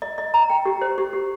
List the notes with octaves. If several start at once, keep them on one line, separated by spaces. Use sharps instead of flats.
D#5
D#5
A#5
G5
G4
C5
G4
G4